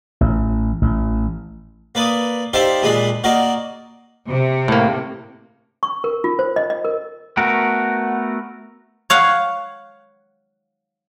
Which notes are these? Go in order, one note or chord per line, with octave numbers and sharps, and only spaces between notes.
A1
A1
A#3 B4 D5 D#6
D#4 G4 C5 D5 E5 F5
A#2 G#3 D4 D#5 B5
A#3 F#4 A#4 D5 D#5
C3
A2 A#3
C#6
A#4
F4
C5
D#5
D#5
A#4
A3 B3 F#4 A#4
C#5 F5 F#5